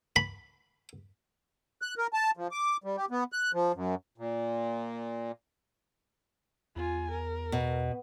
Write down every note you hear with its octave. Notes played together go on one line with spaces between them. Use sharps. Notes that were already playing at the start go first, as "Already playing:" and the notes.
B5
F#6
A#4
A5
F3
D6
G3
G4
B3
F#6
F3
F#2
A#2
E2 F4 G#5
A#4
B2